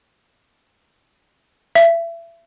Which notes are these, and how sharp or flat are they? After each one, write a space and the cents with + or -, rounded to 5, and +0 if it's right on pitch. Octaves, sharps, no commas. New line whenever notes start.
E5 +30